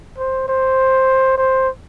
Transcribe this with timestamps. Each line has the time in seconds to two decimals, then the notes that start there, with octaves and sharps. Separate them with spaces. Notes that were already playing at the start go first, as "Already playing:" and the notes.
0.18 C5
0.48 C5
1.38 C5